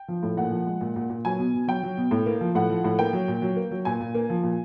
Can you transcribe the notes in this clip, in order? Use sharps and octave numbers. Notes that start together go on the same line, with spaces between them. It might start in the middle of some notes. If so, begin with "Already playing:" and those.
Already playing: G5
F3
A2
A#2 F#5
F3
G#3
A#2
A#2
A#2
F#3 G#5
B2
B2
F#3 G5
F#3
B2
A2
A#3
F3
A2 F#5
F3
A2
A#3 G5
F#3
A#2
F#3
A#3
F#3
A#2 G#5
A#2
A#3
F3
A#2